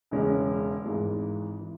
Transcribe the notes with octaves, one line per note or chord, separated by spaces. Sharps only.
E1 E2 C#3 G#3 C#4
G#1 G#2 E3 G#3
E3